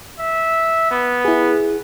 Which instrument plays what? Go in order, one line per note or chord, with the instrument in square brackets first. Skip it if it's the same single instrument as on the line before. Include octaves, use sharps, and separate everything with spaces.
[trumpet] E5
B3
[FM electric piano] E4 G#4